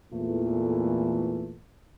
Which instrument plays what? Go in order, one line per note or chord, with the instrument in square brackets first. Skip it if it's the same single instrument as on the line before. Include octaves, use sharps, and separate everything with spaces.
[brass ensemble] E2 A#2 E3 A3